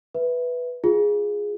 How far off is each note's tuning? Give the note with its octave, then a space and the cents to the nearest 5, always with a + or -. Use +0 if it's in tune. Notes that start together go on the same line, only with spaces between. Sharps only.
B4 +0 E5 +0
F4 +0 G#4 -5